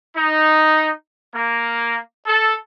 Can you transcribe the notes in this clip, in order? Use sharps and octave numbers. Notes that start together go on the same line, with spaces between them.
D#4
A#3
A4